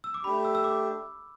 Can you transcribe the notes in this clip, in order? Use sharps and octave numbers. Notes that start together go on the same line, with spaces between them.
E6
D6
A3 D4 G4 B5
E6
E6
D6